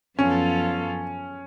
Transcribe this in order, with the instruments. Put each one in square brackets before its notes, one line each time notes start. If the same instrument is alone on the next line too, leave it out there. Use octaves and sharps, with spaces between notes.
[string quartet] F#2 F3 B3 F4 A4 [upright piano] C#4